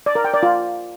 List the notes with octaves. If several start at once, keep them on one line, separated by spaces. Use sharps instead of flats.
D5
A#4
G5
D5
F4